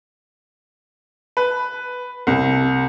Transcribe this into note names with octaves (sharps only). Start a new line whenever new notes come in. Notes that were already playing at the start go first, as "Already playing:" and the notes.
B4
C2